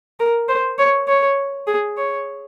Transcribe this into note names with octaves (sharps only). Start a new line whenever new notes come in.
A#4
C5
C#5
C#5
G#4
C#5